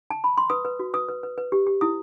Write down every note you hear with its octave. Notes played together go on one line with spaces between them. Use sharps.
A5
B5
C6
B4 D#6
B4
F#4
B4 D#6
B4
B4
B4
G4
G4
E4 D#6